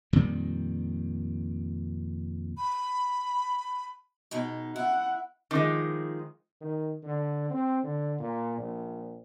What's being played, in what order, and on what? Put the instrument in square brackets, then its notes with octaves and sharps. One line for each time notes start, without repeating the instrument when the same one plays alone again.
[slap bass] F2 A#2 D#3 G3
[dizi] B5
[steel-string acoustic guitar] B2 G#3 D#4
[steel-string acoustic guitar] E4 [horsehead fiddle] F#5
[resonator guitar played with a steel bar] D#3 F3 G#3 [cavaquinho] D6
[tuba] D#3
D3
C4
D3
A#2
A#1